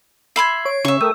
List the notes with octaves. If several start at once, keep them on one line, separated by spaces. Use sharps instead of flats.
E5 B5 C6 G#6 C7
C#5 D7
C#3 E5 C#6
A3 A#4 G5 D#6 E6